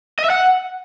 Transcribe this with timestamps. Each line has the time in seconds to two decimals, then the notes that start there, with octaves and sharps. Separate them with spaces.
0.19 D#5
0.24 E5
0.30 F#5